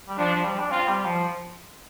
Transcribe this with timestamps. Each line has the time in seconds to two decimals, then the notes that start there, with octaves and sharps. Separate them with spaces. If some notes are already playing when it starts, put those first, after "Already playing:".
0.09 G3
0.18 F3 D4
0.35 F3
0.45 G3
0.59 D4
0.70 C4 F4
0.88 G3
1.06 F3